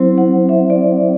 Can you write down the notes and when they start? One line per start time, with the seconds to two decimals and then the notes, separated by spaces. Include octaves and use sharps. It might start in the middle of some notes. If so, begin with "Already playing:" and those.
Already playing: F#3 C4 E4 C5
0.18 F#5
0.49 E5
0.70 D5